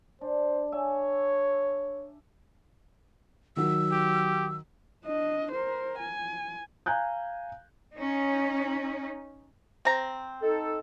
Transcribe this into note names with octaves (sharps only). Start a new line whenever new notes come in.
D4 C5
C#5 E5 G#5
D#3 F#3 F#4 E6
G4
D4 D#5
A#4 C5
G#5
F5 G#5 A#5 F#6 G6
C#4 D#4
C4 A#5
D#4 A4